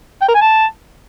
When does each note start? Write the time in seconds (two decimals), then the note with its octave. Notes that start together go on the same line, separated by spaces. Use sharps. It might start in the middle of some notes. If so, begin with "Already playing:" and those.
0.21 G5
0.28 A#4
0.35 G#5
0.41 A5